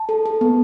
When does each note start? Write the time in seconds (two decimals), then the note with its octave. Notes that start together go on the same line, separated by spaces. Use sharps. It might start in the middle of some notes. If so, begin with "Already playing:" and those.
Already playing: A5
0.09 A4
0.26 A4
0.41 B3